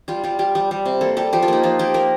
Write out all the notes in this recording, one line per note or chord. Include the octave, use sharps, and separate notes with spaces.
G3 F4
G3 F4
G3 G4
G3
G3
C3
A#3 A4
G3 A4
F3 G4
F4
A#3 D#4
F3 F4
A#3 G4
A#3 A#4